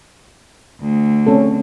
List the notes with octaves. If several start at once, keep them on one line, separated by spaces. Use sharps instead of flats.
D2
C4 C#4 A4